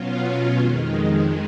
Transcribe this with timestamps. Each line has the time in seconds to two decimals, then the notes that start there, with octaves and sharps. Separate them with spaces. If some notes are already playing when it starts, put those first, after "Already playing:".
Already playing: B2 F#3 C#4 F4
0.55 F2 D#3 G#3